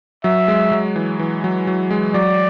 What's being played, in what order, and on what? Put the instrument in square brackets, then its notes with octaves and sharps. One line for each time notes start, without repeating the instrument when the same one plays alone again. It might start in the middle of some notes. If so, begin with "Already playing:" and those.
[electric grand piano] F#3 [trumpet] E5
[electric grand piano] G#3
F#3
E3
E3
F#3
F#3
G#3
[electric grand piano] F#3 [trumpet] D5